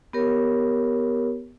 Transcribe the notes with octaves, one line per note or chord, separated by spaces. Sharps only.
B3 G4 A#4 C#5